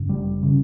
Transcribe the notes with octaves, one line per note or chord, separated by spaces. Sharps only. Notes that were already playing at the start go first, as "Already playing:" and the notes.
Already playing: G1 F#2 C#3
G3
C#3